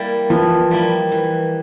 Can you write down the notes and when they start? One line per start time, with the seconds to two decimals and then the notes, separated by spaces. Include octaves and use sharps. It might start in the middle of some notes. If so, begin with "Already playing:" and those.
Already playing: G3 A#3 E4
0.30 E3 F3
0.71 G3 A#3 E4
1.12 E3